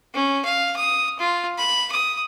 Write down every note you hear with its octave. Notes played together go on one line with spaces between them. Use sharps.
C#4
F5
D#6
F4
B5
D#6